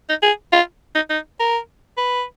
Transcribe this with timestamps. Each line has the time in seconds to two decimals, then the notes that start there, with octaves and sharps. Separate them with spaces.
0.09 D#4
0.23 G#4
0.52 F4
0.95 D#4
1.10 D#4
1.40 A#4
1.97 B4